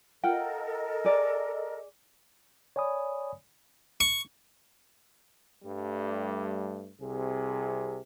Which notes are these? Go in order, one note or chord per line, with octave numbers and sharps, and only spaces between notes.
F4 A4 A#4 D#5 F#5 G5
G#4 D5
C#5 D5 G#5 B5 D#6
C#6
G2 G3 A3
C2 C3 G#4